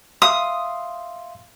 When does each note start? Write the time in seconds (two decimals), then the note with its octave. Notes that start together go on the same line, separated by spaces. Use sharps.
0.22 E5 F5 C6 D#6